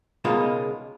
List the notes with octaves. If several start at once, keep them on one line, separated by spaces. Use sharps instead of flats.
C#2 B2 G#3 A#3 D#4 F4